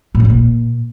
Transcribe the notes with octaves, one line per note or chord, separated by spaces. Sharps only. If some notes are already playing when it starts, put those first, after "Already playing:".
A2
F3
C#3
A#2